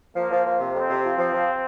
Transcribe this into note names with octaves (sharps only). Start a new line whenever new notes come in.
F3 A#3
F3
F3
C3
F2 C4
C3
F3
F3
F3